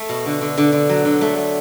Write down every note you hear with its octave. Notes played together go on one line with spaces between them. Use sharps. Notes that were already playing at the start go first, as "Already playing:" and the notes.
Already playing: A3
B2
D3
D3
D3
D3
F#3
D3
A3
A3